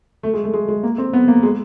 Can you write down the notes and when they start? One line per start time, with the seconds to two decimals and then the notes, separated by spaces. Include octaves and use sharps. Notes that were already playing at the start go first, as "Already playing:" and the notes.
0.23 A3
0.34 G#3
0.44 A3
0.54 G#3
0.68 G#3
0.83 A#3
0.98 C4
1.13 B3
1.28 A#3
1.43 G#3